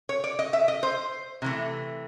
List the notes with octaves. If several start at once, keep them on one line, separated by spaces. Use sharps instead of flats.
C#5
D5
D#5
E5
D#5
C5
C3 E3 A3